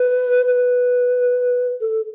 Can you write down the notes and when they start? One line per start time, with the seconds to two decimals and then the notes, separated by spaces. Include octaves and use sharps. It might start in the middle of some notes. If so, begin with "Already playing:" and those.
Already playing: B4
0.48 B4
1.81 A4